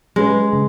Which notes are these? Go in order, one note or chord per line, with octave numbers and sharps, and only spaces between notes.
F#3 G#3 C#4 G#4 B4
C#3